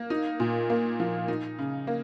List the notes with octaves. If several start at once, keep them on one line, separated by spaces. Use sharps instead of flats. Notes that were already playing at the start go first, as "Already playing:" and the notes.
Already playing: A#3
D#4
A#2
A#3
F3
D#4
C#3
A#3